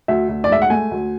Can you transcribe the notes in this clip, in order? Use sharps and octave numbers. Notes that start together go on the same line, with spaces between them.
D2 E5
D2
D5
G#3 E5
F#5
A3 G#5
D2